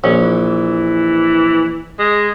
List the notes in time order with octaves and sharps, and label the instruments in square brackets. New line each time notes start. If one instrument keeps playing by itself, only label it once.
[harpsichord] A#1 [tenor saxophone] C#4
[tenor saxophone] E3
G#3